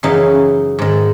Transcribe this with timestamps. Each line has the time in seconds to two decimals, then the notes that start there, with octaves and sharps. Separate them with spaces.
0.03 F#2 C#3 E3 D#4
0.79 G#2 D#3